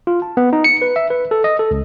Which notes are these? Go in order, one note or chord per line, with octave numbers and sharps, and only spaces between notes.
F4
A5
B3
D#4
C#7
B4
E5
B4
A4
D#5
A4
C#2